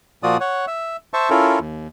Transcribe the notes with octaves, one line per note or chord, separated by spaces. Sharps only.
A#2 F3 F4 F#4 D5 D#6
C#5 F#5
E5
C5 E5 A5 C#6
C#4 E4 F4 A4 A#4
D#2